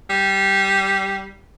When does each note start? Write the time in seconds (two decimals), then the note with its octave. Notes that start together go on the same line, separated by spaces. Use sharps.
0.10 G3